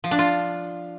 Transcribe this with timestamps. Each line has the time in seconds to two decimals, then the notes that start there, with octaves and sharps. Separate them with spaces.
0.04 F3
0.11 D4
0.19 F4